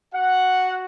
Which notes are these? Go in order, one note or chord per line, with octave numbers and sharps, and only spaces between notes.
F#4 F#5